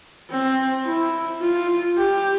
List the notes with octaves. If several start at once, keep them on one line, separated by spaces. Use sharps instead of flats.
C4
E4
F4
G4